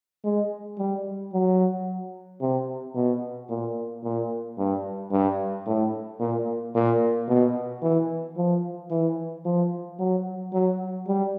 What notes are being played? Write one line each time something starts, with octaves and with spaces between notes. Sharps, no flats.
G#3
G3
F#3
C3
B2
A#2
A#2
G2
G2
A2
A#2
A#2
B2
E3
F3
E3
F3
F#3
F#3
G3